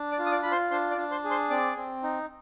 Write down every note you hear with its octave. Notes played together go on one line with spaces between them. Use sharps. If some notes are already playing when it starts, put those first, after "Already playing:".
Already playing: D4
D5 D6
F4
D#6
D5 D6
F4 B5
C5 C6
D4 C5 C6
D5 D6
D4
C5 C6
G#4
C5 C6
C4 D5 D6
C4
D#4